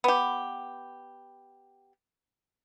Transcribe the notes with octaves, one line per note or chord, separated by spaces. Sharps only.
B3 G4